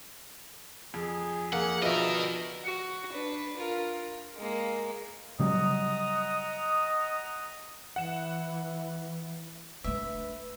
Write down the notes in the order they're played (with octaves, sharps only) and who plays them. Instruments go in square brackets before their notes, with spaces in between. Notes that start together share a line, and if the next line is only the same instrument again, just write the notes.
[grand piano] F2 [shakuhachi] G#4
[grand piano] F2 [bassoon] A#3 [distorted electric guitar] F#5
[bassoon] B2 [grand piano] F3 D4 E5 [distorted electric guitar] A#4 D#5
[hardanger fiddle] F#4
D4 B4
F4 A#4
G#3 A#3
[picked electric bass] C#3 F#3 G3 [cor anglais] D#5 [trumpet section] F#5 A#5 D#6
[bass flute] E3 [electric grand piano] F#5 E7
[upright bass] A3 D4 [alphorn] B4 [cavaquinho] E5